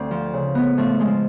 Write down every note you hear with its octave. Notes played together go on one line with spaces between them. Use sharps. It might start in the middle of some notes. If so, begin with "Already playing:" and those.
Already playing: D2 C4
F3
C#3
A2 B3
F3 A3
F3 G#3